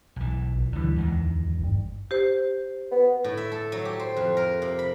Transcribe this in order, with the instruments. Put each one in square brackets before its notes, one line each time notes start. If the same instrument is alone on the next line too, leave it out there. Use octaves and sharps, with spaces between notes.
[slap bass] B1 E3
[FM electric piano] A#1
[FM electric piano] D2 E3 [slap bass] D3 G3
[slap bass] E2 G#2 D#3
[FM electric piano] G#1 G2
[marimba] G4 C5
[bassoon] B3
[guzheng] A2
E5
A4
F#3
G4
C5
F2
A#4
C3
B5